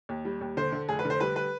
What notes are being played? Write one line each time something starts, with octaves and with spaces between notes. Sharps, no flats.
D#2
G3
D#2
D3 C5
D3
F1 G#4
B4
D3
C5
G3 B4
B4